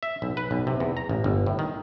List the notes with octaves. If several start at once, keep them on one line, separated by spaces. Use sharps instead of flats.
E5
B1
B4
B1
C3
E2
A#5
A1
G1
A2
D#3